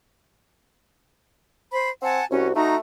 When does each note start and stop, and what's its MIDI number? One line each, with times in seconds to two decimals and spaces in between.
1.72 1.90 72
1.72 1.90 83
2.02 2.20 60
2.02 2.25 78
2.02 2.25 80
2.02 2.25 81
2.31 2.52 36
2.31 2.47 61
2.31 2.52 66
2.55 2.79 57
2.55 2.75 63
2.55 2.77 66
2.55 2.77 82